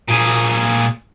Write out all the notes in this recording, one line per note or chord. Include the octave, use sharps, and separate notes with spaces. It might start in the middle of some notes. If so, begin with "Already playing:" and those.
A#2 G#4